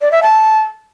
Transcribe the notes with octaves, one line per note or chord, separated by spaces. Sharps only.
D5
E5
A5